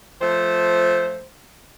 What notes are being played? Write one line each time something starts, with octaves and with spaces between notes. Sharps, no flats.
F3 A3 C5